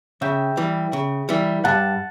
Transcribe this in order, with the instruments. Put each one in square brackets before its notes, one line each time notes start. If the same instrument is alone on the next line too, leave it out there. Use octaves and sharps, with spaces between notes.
[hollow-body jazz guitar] C#3 [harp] E5 G5
[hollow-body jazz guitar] E3 G3
C#3
E3 G3
[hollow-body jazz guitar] G2 [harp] F#5 A5